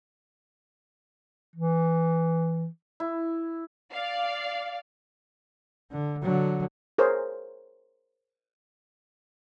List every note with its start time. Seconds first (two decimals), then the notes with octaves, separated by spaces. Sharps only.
1.56 E3
3.00 E4
3.91 D5 F5
5.92 D3
6.22 D3 F#3
6.98 G#4 A#4 C5 C#5